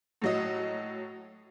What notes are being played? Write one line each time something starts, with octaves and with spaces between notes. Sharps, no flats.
A2 F#3 D#5